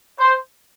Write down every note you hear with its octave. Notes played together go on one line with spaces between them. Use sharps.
C5